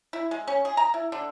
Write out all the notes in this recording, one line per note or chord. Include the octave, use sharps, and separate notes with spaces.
E4
G#3
C#4
G#4
A#5
E4
D3